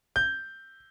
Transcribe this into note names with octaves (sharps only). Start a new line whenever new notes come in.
G6